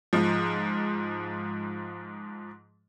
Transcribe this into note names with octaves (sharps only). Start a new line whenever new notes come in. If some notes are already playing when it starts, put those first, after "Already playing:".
G#2 F3